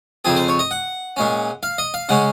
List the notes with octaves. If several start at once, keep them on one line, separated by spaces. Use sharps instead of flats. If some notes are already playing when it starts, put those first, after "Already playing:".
F2 C#3 F3 C4 G#4
C5
C#5
D#5
F#5
A#2 G#3 C#4
F5
D#5
F5
C#3 G#3 C#4 F#5